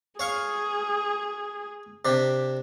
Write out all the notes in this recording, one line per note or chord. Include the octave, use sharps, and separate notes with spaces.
G#4 C#5 F5 C#6
C3 D4 G4